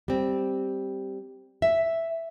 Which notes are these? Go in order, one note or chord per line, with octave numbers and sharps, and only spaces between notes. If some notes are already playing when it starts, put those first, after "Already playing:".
G3 C4
E5